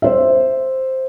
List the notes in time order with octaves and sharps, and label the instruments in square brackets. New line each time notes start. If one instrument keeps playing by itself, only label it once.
[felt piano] C5 E5